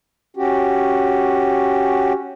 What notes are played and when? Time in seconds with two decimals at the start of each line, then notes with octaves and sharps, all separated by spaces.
0.37 C#4 F#4 G4